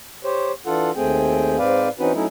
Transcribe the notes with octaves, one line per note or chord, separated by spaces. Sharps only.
G4 C5 C#5
E3 D4 F4 A4 F#5
D#2 A3 C4 G#4 G5
G#2 C4 B4 D5 F5
E3 C4 C#4 D#4 F#4 B4
F#3 A3 C#4 D#4 E4